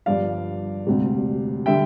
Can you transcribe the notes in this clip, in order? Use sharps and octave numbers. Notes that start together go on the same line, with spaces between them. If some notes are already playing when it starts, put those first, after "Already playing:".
G1 G2 F3 D5 F5
E1 D2 C3
D3 G3 E5 G5